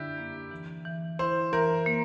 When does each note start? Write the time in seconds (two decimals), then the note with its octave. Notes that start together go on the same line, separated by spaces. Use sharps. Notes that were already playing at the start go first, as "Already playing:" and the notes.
Already playing: D3 D4 E4 G4
0.17 A#3
0.51 E3
0.85 E3
1.19 E4 C5
1.53 E3 A#4
1.86 A#3